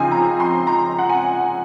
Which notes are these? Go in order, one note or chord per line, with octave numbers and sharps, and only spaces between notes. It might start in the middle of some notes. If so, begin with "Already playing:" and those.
Already playing: C#3 F3 C4 D#4 G#5
A#5
C6
A#5
F#5
G#5